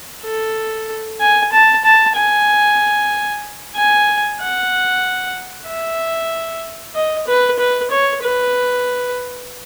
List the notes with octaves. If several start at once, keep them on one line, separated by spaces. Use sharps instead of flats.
A4
G#5
A5
A5
G#5
G#5
F#5
E5
D#5
B4
B4
C#5
B4